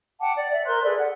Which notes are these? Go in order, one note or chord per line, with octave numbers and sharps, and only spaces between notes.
F#5 G5 A5 D6
D5
D5 E5
A#4 C5 C6 F#6
G#4 A4 B4 D5
F#5